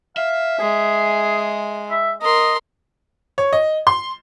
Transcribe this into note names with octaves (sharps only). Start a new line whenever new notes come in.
E5 F5
G#3 G#4
E5
A#4 D#5 C6
C#5
D#5
C6